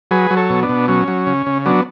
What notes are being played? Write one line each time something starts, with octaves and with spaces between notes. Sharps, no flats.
F#3 G#4 B4
F#3
A4 C#5
B2
B3 D4
B2
F#3 C#4
F#3
C#3
C#3
F#3 B3 D4